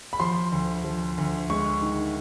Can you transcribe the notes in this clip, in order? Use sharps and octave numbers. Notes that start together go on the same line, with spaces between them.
B5
F3 C6
D2
F3
D2
G#3 C#6
D#3